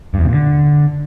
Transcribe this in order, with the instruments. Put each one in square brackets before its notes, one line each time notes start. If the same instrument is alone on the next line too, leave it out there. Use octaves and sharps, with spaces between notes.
[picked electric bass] G2
E2
C3
A#2
D3